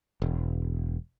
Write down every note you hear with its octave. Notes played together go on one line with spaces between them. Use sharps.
E1